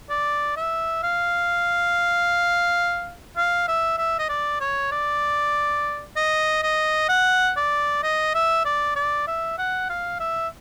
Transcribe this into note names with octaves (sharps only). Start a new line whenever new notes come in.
D5
E5
F5
F5
E5
E5
D#5
D5
C#5
D5
D#5
D#5
F#5
D5
D#5
E5
D5
D5
E5
F#5
F5
E5